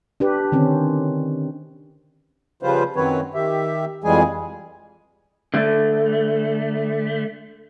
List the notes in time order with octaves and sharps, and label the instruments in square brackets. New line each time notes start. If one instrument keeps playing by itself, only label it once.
[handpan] D4 G4 B4
D3 D#3 C4 C#4
[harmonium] C#3 F3 G3 F4 B4 C5
F#2 D#3 F#3 C4 B4 C#5
D#3 G4 E5
F2 E3 G3 G#3 G#4 G#5
[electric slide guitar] D3 A3